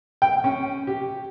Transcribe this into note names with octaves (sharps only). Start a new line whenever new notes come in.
G5
C#4
G4